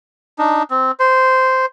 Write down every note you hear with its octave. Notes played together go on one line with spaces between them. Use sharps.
D4 D#4
C4
C5